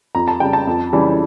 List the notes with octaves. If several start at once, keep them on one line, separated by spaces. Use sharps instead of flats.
F2 A#5
A5
C#3 G3 G5
A5
F2
C#3 E3 G3